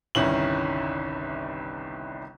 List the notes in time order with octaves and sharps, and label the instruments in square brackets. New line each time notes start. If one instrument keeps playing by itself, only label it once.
[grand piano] G1 C2 D#3 C#4 E4 F#7